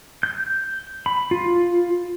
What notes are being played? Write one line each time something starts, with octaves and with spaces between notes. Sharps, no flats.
G6
B5
F4